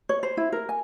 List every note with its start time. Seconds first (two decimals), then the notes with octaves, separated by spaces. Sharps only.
0.09 C#5
0.23 C5
0.37 E4
0.52 A#4
0.69 G#5